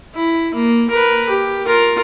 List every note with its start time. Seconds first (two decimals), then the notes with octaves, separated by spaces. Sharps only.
0.15 E4
0.54 A#3
0.90 A#4 B4
1.29 G4
1.66 F4 A#4